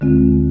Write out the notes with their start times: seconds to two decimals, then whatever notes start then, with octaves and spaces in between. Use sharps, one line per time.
0.01 D2 D3 G#3 C4 F4